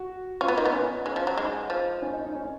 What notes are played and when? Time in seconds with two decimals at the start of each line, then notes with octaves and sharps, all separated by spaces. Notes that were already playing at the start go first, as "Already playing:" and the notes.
Already playing: F#4
0.41 C#4 F4
0.48 B3
0.57 A#3 D#4
0.65 B3
0.73 C#4
1.06 G#3
1.16 F3
1.27 F#3
1.38 G#3 D#4
1.70 F3
2.02 C#4
2.13 D#4
2.25 D#4
2.35 C#4